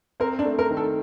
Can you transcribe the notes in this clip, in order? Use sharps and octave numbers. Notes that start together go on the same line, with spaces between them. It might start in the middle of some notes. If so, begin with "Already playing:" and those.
C4 A#4
D4
A3
A#4
D#3
A4